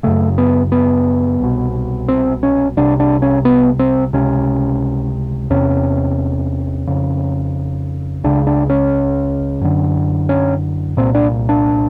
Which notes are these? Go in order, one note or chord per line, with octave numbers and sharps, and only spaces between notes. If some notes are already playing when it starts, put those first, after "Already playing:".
F#2 C#3 A3
B3
B3
C2 B2
C4
C#4
C2 C3 D4
D4
C#4
B3
C4
C#2 C3 C#4
E2 C3 C#4
F2 C#3
C#2 C#3 D4
D4
C#4
F#2 D3
C#4
C2 A#2 C4
D4
D4